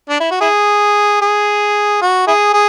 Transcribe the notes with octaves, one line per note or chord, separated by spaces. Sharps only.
D4
E4
F#4
E4 G#4
G#4
F#4
E4 G#4
G#4